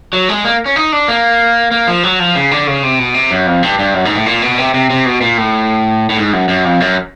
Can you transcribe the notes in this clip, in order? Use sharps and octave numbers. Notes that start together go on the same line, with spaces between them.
F#3
G#3
A#3
C#4
D#4
D4
A#3
A#3
F3
F#3
F3
C#3
D3
C#3
C3
B2
C3
F#2
F2
G2
G2
F#2
G#2
A2
A#2
B2
C3
C3
C3
B2
A#2
A2
A2
G#2
F#2
F#2
F2
F#2